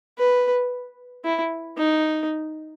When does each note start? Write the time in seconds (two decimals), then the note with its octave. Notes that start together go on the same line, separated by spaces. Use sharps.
0.18 B4
1.24 E4
1.78 D#4